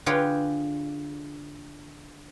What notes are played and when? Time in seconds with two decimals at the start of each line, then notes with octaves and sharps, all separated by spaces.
0.06 D3 F4 G#4 B4 C#5 G5